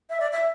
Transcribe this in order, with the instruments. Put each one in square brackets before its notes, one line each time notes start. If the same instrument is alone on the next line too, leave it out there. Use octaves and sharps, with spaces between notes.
[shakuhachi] E5
D5
E5